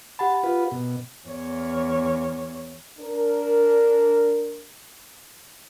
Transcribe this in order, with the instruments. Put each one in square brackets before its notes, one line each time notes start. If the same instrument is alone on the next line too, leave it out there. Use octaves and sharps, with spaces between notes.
[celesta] G4 F#5 B5 [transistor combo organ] A5
[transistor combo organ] F4 B4
B2
[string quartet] E2 C#5
[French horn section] D4 A#4